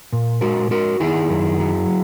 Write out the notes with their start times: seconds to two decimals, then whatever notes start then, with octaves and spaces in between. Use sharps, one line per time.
0.13 A#2
0.41 G#3 F#4 A#4
0.71 G#3 F#4 A#4
1.00 D#3 E4 G#4
1.30 F#2
1.59 F#3